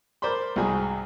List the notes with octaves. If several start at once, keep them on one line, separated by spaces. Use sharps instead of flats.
A#4 C5 D5 B5 C6
C2 G#2 F#4 G#4 B5